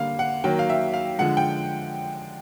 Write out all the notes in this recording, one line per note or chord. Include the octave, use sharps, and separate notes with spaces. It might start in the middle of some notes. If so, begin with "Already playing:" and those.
Already playing: D3 G3 A#3 F5
F#5
D#3 F#3 A#3 G5
F5
E5
F5
D3 F3 G#3 F#5
G5